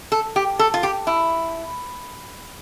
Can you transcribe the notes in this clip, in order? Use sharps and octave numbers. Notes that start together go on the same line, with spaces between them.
A4
G4
A4
F4
G4
E4